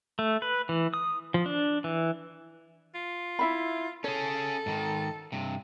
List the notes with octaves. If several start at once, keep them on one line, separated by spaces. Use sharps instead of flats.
A3
B4
E3
D#6
F3
D4
E3
F4
E4 E5 B5
C#4 G#4 A4 C#5
G#2 D#3
G2 C3